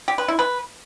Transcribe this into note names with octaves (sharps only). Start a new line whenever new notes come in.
G4
B4
E4
B4